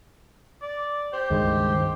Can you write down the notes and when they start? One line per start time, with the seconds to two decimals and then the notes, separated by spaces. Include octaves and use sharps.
0.62 D5
1.13 G4 C5
1.30 C#2 G2 D#3 G#3